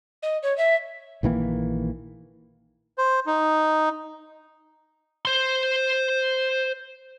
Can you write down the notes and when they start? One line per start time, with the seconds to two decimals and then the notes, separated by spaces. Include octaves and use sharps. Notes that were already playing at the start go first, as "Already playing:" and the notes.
0.22 D#5
0.43 C#5
0.57 E5
1.23 A#1 D#3 E3 A#3
2.98 C5
3.26 D#4
5.25 C5 C6